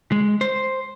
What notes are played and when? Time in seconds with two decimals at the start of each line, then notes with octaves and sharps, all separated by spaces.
0.12 G#3
0.41 C5